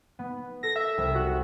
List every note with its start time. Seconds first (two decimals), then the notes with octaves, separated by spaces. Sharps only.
0.19 B3
0.63 A4 A#6
0.76 E5
0.98 C2
1.15 F#4